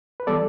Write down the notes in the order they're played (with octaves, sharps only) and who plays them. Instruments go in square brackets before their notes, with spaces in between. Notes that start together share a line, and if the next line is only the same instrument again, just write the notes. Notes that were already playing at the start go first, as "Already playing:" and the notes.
[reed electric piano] B4
E3 G3 B3 A4 D5